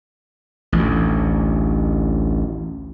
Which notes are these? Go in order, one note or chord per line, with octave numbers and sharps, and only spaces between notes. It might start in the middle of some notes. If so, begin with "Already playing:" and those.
A1 D2